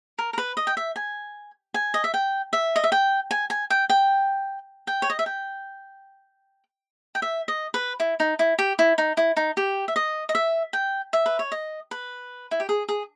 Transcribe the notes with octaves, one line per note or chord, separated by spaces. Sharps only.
A#4
A#4
B4
D#5
G5
E5
G#5
G#5
D#5
E5
G5
E5
D#5
E5
G5
G#5
G#5
G5
G5
G5
C#5
D#5
E5
G5
G5
E5
D#5
B4
E4
D#4
E4
G4
E4
D#4
E4
D#4
G4
E5
D#5
D#5
E5
G5
E5
B4
C#5
D#5
B4
E4
G4
G#4
G#4